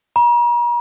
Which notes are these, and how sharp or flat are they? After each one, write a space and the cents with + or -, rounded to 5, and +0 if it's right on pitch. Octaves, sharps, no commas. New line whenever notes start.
A#5 +45